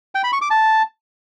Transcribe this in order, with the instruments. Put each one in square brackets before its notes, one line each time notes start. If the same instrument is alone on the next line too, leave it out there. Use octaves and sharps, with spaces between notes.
[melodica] G5
B5
C#6
D6
A5